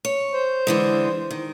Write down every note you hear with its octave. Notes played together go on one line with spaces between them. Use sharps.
C#5
C5
D3 E3 G#3
D#3